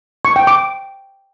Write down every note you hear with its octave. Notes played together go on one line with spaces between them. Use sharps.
C#6
G5
D6